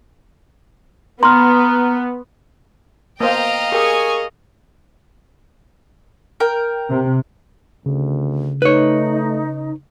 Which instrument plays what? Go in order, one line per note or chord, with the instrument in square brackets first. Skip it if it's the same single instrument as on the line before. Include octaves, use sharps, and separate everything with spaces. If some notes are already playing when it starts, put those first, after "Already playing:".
[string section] B3 [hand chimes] A#5 F6 [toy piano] C6
[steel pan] A#3 B3 C5 [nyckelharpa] D#5 F5 [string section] G5 A#5
[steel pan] G4 [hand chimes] G#4 A#4 D#6 [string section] G#5 C#6
[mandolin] A#4 G5
[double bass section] C3
[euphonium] D2 [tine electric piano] C#3
[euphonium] A3 [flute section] D#4 [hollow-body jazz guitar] B4 C#5